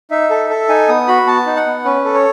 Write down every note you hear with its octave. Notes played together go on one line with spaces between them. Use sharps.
D#4 E5
A4
A4
D#4 G#5
B3 D#6
F#4 B5
B3 A5
D#4
F#5
B3
C#4 B4
A4
C#5